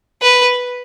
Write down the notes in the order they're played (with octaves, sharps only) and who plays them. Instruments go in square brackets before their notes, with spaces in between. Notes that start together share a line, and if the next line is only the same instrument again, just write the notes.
[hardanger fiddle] B4